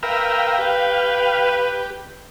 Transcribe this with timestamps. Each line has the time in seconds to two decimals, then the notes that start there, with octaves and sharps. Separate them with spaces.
0.03 A#4 B4 E5 F5 G5
0.59 G4 B4